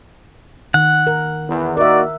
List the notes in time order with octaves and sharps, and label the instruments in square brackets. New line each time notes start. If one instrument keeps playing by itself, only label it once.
[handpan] D#3 [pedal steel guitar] F#5
[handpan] A#4
[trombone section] E2
[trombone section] A#3 D#4 F#4 [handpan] A#4 E5 [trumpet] D5